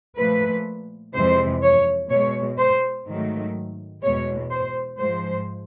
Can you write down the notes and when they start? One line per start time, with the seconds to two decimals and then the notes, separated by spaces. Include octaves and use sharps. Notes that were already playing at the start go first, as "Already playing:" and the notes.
0.17 A#2 F3 A3 B4
1.13 F2 C3 E3 G#3 C5
1.62 C#5
2.10 B2 G#3 C#5
2.58 C5
3.06 G#2 D#3 F#3 A3
4.03 E2 B2 G#3 C#5
4.50 C5
4.99 G#2 F3 G#3 C5